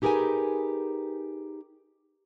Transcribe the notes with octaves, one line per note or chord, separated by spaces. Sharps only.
D#4 G4 G#4 A#4 B4 G#5